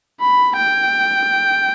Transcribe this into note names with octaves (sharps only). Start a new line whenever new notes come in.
B5
G5